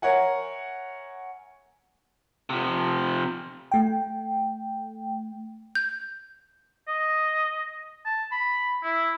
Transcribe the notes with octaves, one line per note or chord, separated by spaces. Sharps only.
A#4 C#5 E5 F#5 G#5
C3 F3
A3 G5
G6
D#5
A5
B5
E4